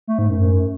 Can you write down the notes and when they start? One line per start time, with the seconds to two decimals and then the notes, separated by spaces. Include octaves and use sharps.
0.08 A3
0.18 G#2
0.29 F#2
0.40 F#2